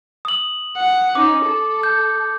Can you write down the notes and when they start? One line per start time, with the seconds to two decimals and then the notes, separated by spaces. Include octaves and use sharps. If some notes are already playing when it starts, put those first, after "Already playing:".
0.25 D#6 F#7
0.77 F#5
1.15 C#4 D#4 D6
1.47 A4
1.83 G6